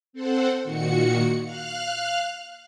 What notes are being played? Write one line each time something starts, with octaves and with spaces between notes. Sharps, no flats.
C4 A4 C5 F#5
A#2 D#3 F#4 C#7
F5 F6 F#6